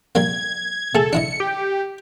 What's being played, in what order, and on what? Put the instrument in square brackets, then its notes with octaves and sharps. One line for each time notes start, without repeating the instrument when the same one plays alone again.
[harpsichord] G3 A#3 [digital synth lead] G#6
[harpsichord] A3 G#4 [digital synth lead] A4
[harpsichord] D4 E4 D#5 [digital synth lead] C#7
[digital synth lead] G4